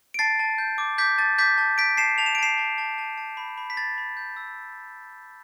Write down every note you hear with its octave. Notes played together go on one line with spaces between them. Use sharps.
D7
A5 A6 C7
A5
G6
D6
D6 G6 B6
A5 A6
D6 G6 B6
A5
G6 B6 D7
A5 C7 E7
A5 F7
E7
D7
A5 C7 E7
A5
A5
A5
A5
B5
B5
B6
B5 A6
B5
G6
E6